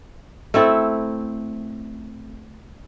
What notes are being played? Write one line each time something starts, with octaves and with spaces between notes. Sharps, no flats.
A3 C4 E4 A4